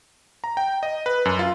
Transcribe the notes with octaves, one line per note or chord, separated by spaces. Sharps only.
A#5
G5
D#5
B4
F#2
F4